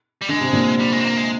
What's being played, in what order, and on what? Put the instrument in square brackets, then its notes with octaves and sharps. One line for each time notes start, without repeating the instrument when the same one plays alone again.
[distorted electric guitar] G3
[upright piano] D3 [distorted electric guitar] G#3
[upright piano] C3
A#2 D3
[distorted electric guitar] G3
G#3
C4
A#3
G#3